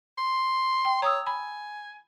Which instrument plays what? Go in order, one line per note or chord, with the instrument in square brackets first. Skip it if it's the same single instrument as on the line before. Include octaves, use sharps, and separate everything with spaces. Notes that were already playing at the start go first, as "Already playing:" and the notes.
[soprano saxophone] C6
[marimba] G5
[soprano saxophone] C#5 [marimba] A#5 D#6 E6
[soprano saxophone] G#5 [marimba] B5